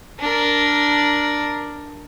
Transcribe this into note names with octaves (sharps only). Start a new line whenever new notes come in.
D4 A#4